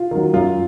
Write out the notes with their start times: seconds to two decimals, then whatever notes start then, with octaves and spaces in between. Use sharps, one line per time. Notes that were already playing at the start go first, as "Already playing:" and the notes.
Already playing: F4
0.11 D#3 F#3
0.33 F#2 F4